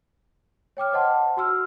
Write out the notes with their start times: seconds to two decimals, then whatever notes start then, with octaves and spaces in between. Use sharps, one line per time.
0.77 C#5 G5 D6 F6
0.93 C5 D#5 F#5 A5 C6
1.37 F#4 C6 E6 F6